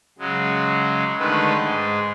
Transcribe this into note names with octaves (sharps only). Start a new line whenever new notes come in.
C#3 F#3 G#3
D3 D#3 G#3 A3 B4
G#2 G#3